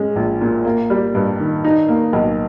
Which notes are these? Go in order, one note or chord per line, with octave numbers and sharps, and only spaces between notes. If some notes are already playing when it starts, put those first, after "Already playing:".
Already playing: G#3 C#4
A#1
A#2
A#3
G3
G2
D#3
D#4
A#3
B1